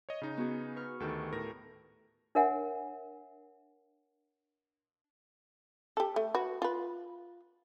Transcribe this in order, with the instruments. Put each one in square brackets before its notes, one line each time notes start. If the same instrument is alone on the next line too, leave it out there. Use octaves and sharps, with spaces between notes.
[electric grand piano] C#5 D#5
C#3 D#4
[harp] B3 F#4 G#4
B4 C#6 F6
[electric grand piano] D2 D#3 [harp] G4 A4 B4
[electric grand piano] A2 A#4 A#6
[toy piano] D4 A#4 C#5 E5 F#5 G#5
[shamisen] G4 A4
A3
F#4 B4
F4 B4